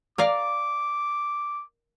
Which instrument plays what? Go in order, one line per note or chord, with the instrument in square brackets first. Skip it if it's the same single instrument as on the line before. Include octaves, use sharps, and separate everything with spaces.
[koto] A#4 D5 F5 [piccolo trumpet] D6